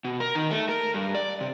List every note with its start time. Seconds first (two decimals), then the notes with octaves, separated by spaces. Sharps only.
0.04 B2
0.20 A#4
0.35 D#3
0.51 A3
0.69 A#4
0.94 G2
1.15 D5
1.41 C3